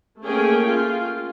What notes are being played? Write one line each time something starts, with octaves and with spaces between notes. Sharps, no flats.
A3 A#3 C#4 G#4 A#4 G5
F4